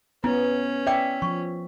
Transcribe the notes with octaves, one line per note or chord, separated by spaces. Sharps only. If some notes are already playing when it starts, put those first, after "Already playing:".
B3 C#4 E4
D5 E5 G5 D6
F3 C#6